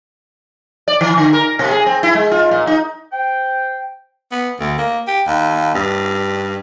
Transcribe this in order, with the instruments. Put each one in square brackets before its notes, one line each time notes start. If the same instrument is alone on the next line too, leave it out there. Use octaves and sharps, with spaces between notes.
[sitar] D5
D#3
D3
A#4
B2
G#4
C4
E4
G#3
F4
A#2
D#4
[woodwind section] C5 G5
[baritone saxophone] B3
D2
A#3
G4
D#2
G2